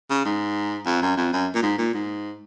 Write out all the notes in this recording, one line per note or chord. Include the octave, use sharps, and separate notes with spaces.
C#3
G#2
F2
F#2
F2
F#2
A#2
G#2
A#2
G#2